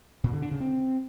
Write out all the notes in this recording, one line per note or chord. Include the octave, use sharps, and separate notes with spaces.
A#2
D3
D4
C#3
C4